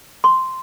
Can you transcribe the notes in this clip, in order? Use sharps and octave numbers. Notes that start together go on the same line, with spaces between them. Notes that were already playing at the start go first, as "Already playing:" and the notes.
C6